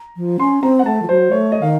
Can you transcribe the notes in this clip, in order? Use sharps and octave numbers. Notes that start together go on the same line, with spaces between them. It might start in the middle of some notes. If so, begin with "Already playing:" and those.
Already playing: A#5
F3
C#4 C6
C4 A#5
F#5
A3 A5
F3
F#3 C5
A3 C#5
D#5
D#3 F5